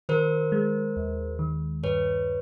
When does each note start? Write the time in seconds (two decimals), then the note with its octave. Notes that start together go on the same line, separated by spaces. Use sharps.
0.09 D#3 A#4 C5
0.52 G#3
0.96 D#2
1.39 D#3
1.84 G2 B4 C#5